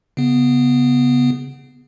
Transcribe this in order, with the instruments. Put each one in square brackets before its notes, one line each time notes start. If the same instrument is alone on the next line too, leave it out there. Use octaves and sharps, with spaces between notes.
[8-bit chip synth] C#3 B3